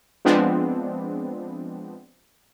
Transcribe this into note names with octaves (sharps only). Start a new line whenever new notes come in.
F3 G#3 B3 C4 D4